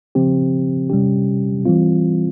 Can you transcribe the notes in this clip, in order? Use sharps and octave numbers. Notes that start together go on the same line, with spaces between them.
C#3 F3 C4 G4
C3 G3 C#4 G4
E3 G3 C4 F4